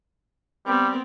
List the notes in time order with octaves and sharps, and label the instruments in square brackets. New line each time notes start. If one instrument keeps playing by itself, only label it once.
[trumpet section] G3 [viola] B3 C4